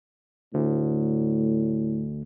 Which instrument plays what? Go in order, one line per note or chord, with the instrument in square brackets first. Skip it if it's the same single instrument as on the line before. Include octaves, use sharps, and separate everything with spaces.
[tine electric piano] D2 [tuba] A2